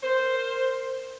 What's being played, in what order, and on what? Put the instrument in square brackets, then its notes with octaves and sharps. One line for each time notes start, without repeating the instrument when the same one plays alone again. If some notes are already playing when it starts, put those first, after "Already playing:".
[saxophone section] A#4 C5